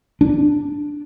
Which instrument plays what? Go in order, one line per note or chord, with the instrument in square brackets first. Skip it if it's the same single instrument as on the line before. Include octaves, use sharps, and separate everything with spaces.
[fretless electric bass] D4